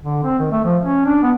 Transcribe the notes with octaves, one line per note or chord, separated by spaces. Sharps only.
D3
C4
D#3
A3
F3
C#4
D4
B3